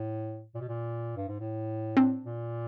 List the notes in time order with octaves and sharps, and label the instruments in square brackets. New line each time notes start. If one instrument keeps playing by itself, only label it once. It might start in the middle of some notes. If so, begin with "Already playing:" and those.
Already playing: [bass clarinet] A2
A#2
B2
A#2
G2
G#2
A2
[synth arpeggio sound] C4 D4
[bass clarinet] A#2